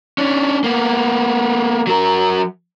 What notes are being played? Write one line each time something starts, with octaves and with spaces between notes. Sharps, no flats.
C#4 D4
A#3 B3
F#3 A#4